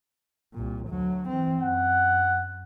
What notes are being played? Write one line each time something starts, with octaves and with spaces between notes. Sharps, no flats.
C2 A#2
D2 F#3
E3 C4
F#2 F#5